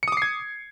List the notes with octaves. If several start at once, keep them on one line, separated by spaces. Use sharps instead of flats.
D6 D#6 G#6 C7 C#7